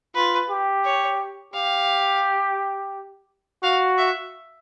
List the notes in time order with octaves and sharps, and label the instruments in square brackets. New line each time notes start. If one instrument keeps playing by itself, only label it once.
[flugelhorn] F4 [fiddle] B4
[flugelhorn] G4
[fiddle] C#5
[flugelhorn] G4 [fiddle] F5
[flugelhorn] F#4 [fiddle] F5
[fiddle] E5